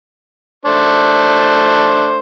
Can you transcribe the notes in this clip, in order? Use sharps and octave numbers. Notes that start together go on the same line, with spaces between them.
A3 D4 C5